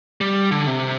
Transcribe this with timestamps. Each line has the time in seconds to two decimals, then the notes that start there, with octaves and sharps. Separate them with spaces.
0.21 G3
0.51 D3
0.67 C3